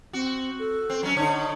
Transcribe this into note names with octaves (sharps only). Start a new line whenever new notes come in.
C4 F#4
A4
C4
F#3 C#4
D3 D#4 C#5